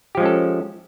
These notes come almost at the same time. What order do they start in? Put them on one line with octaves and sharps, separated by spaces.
G4 F3 G#3 C#4 A4